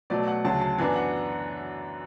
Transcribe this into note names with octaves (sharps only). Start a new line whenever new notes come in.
B2 F#3 A3 D5
F#5
D2 C#3 F#3 A5
A5
F#2 E3 B3 D4 G#5
F#5